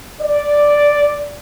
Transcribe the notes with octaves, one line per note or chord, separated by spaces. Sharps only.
D5